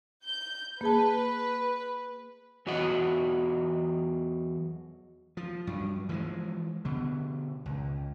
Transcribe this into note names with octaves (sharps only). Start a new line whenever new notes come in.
G6
A#3 G#4 B4 A5
E2 F#3 F#4 D#5 F#5
F3
G2 F#3
E3 F3 G3 G#3
B2 D3
C#2